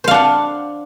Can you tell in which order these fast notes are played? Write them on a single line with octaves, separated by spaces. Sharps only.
C5 F5 D4 F#5